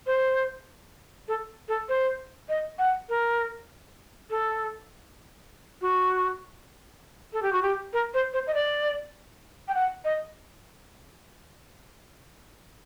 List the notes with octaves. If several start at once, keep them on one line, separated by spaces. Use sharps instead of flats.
C5
A4
A4
C5
D#5
F#5
A#4
A4
F#4
A4
G4
F#4
G4
A#4
C5
C5
D#5
D5
G5
F#5
D#5